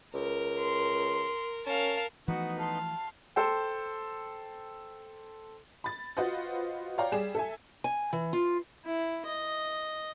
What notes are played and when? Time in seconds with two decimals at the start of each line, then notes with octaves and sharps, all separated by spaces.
0.14 C#2 A#4
0.59 C6
1.66 C#4 A#4 F5 A5
2.28 E3 F3 A3 B3 D#4 F#4 B4
2.59 F5 A5 C6
3.36 A4 C5 G5
5.84 B5 A6
6.17 F4 F#4 B4 C5 D#5 F#5
6.98 C#5 D5 F5 G5 A#5
7.12 G3 G#4 D5 E7
7.35 A4 E5 G#5
7.84 G#5
8.13 E3
8.33 F4
8.85 E4
9.25 D#5